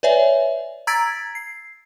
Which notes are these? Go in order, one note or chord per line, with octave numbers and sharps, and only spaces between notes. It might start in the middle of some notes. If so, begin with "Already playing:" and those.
B4 C#5 D5 E5 G#5
A#5 E6 G#6 A6 B6 D7
C7